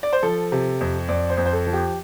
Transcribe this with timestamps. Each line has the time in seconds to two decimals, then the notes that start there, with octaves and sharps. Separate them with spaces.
0.03 D5
0.13 C5
0.23 F3 A4
0.52 C3
0.81 F2
1.08 F2 D5
1.30 C5
1.37 F2
1.46 C5
1.53 A4
1.67 F3
1.73 G4